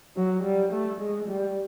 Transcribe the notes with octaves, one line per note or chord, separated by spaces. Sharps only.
F#3
G3
A3
G#3
G3